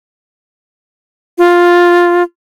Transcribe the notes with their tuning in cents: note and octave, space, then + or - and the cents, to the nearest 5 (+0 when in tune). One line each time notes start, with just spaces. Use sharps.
F4 +5